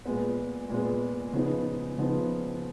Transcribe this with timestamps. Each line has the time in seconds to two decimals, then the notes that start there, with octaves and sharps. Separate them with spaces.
0.05 A#2 G#3 B3
0.70 A#2 G#3 B3
1.33 C#3 F3 B3 D#4
1.98 C#3 F3 B3 D#4